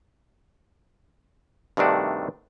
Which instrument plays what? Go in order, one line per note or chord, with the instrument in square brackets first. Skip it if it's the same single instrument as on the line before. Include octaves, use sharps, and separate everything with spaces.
[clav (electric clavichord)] G2 C3 D#3 A3 D4 F#4